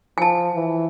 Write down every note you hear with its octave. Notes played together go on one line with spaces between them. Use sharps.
F3 G#5 A5
E3